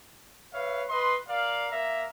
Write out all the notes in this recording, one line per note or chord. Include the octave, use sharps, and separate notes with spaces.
B4 C#5 E5 F5
B4 D#5 C6
A#4 D5 F5
A#3 A#4 E5 A#5